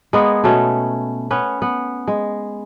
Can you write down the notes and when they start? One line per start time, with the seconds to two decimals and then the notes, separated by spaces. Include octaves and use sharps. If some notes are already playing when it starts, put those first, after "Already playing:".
0.13 G#3 A#3 B3 G#4
0.44 B2 A3 C#4
1.31 B3 C#4 B4
1.62 B3
2.07 G#3